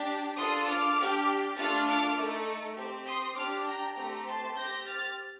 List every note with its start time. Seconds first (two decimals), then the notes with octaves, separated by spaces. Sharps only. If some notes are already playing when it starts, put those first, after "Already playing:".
Already playing: D4 G4
0.37 D4 F4 A4 C6 D#6
0.67 D6 F6
0.98 D4 G4
1.56 A3 D4 F4 A4 F6 A6
1.87 D6 F6
2.16 A3 D#4 A4
2.77 C4 G4
3.07 C6 D#6
3.36 D4 G4 D6 F6
3.67 G5 A#5
3.96 A3 C4 G4 G5 A#5
4.26 A5 C6
4.56 C4 G4 G6 A#6
4.86 F6 A6